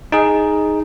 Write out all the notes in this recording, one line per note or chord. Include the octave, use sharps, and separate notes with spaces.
D#4 G#4